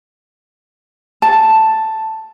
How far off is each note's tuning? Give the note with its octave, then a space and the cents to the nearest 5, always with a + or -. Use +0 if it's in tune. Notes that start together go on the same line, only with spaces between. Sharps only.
A5 +5